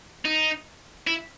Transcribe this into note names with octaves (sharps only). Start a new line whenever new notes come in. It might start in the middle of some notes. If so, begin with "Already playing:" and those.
D#4
E4